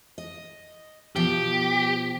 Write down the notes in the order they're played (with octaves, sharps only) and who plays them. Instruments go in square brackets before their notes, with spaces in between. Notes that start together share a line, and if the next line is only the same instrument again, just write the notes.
[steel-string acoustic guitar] D#5
[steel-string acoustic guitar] B2 F3 [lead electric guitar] G4